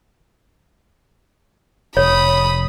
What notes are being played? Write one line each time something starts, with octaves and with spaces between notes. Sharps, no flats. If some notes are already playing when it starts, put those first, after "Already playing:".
F1 C#5 B5 D#6